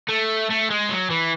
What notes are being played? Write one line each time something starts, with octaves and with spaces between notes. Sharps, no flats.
A3
A3
G#3
F#3
E3